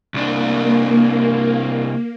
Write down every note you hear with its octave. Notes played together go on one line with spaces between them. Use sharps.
C2 A#3 D4